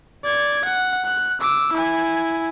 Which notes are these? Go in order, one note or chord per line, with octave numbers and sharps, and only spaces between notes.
D5 G#6
F#5
F#6
D6 E6
E4 G#5